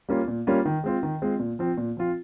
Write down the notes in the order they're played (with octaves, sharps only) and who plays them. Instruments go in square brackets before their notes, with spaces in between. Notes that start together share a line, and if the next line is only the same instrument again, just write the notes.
[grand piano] G3 A#3 C#4 F4
A#2
G3 A#3 C#4 F4
D#3
G#3 C4 F4
D#3
G#3 C4 F4
A#2
F3 C4 F4
A#2
F3 C4 F4